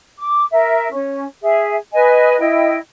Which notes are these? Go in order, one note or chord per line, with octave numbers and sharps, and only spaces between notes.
D6
A#4 E5
C#4
G#4 E5
B4 D#5 G#5
E4 D#5 G5